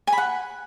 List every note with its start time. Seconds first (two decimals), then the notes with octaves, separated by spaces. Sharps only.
0.07 G#5
0.13 B5
0.18 F#5